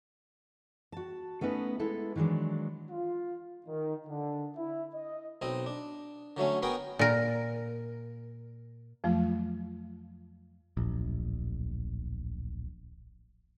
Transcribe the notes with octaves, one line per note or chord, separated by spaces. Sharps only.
F#4 A5
A3 B3 C#4 D#4 B4
G#3 B3 E4 A4
D#3 E3 F#3 G#3 D4
F4
D#3
D3
E4
D#5
B1 C4 D#5
D4
D3 F#3 A3 C#4
B3 F#4 G#4 A#4 B4 G5
A#2 A#4
F2 F3 F#3 A3 F4
D1 A#1